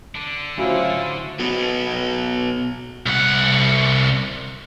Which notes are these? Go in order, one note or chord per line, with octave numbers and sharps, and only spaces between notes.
D3 D4
A2 C#3 F#3 C#4 E4 F4 C5
F#3 B3 F#4
C2 F#5